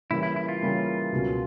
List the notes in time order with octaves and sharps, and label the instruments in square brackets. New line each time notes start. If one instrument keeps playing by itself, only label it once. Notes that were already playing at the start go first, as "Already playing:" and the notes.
[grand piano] C#3 E3 G3 A#3 [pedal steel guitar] E4
[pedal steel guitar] E4
E4
F4
[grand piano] C#3 E3 G3 A#3
C#2 B2 F#3 A#3 C#4